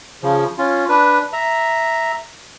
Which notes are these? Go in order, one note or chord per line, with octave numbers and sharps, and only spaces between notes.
C#3 F3
C#4 F4
D4 B4
E5 A#5